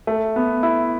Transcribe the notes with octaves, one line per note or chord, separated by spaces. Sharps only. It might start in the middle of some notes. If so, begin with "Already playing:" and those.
A3
B3
E4